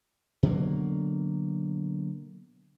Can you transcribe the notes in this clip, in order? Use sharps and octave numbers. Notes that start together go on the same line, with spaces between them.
B2 D3 F#3 A#3